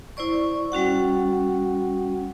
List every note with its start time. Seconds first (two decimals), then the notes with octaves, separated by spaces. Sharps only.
0.17 E4 C5 D5 C#6
0.72 G3 C#4 F#4 F#5